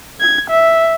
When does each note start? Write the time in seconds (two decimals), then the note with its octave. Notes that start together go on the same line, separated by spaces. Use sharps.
0.20 G#6
0.50 E5